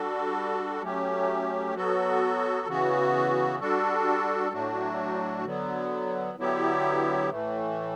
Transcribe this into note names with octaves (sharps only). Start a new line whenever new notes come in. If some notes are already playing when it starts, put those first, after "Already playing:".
Already playing: G3 D4 F#4 A4
F#3 A3 C#4 G4
F#3 B3 F#4 A4
C#3 E3 B3 F#4
G3 D4 F#4 A4
A2 F#3 A3 D4 F#4
D3 F#3 B3
D3 F#3 B3 E4 G4
A2 E3 A3